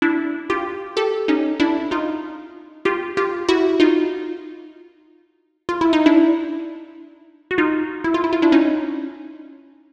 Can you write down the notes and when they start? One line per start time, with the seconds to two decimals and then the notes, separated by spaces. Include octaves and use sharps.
0.02 D4 E4
0.50 F4 G4
0.97 G4 A4
1.28 C#4 D#4
1.60 D4 E4
1.91 D#4 F4
2.85 F4 G4
3.17 F4 G4
3.49 E4 F#4
3.80 D#4 F4
5.69 F4
5.81 E4
5.93 D#4
6.06 D4 E4
7.51 F#4
7.58 D#4 F4
8.04 E4
8.14 F4
8.24 E4
8.33 F4
8.42 D4 E4
8.52 C#4 D#4